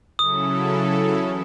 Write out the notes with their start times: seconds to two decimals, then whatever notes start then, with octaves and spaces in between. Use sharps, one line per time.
0.19 C#3 F#3 C#4 E4 A4 D#6
1.14 E3